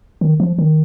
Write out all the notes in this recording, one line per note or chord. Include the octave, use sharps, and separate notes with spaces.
D#3
F3
D#3